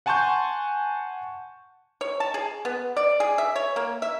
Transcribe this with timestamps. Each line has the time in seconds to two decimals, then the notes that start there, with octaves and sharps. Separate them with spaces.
0.06 F#5 G#5 A5 C6 C#6 G6
2.01 C#5
2.20 A5
2.34 G#4
2.65 B3
2.97 D5
3.20 G#4
3.38 E5
3.56 C#5
3.76 A#3
4.02 E5